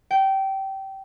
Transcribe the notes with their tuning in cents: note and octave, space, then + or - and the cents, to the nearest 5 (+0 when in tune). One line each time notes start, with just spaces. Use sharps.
G5 -20